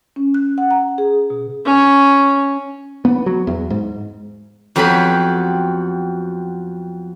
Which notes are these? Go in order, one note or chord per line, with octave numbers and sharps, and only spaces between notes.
C#4
F#6
F#5
A#5
G#4
B2
C#4
B3
F#3
E2
G#2
F2 F#3 B3 G4 G#5 B5